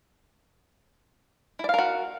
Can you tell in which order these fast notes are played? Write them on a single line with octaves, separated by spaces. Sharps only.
E4 D5 F5 A#4 F#4